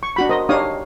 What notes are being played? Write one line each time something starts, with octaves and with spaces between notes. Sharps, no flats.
C#6
D4 F#4 B5
A#4 C5 D#5
D4 D#4 G4 C#5 F5 D#6